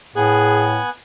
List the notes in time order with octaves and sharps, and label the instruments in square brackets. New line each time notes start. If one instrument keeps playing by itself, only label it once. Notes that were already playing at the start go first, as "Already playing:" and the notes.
[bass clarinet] A2 [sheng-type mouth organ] B3 G#5 F#6 [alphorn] G#4